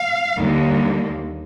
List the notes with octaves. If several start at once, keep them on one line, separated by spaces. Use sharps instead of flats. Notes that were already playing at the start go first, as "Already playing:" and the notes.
Already playing: F5
D#2 D3 G3 A#3